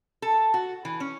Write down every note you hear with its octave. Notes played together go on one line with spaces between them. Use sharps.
A4
F#4
E3
C#4